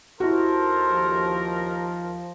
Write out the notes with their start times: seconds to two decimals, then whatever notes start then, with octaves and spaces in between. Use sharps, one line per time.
0.20 D#2 E4 F#4 A4 A#4 C5
0.92 F3